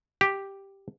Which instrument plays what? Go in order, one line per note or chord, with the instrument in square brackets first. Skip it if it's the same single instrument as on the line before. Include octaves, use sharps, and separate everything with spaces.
[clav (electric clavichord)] G4